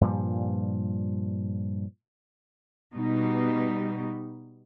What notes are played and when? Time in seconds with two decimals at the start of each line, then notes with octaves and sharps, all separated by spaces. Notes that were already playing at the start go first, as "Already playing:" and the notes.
0.01 G2 A#2 F3 G3
2.93 B2 G3 D#4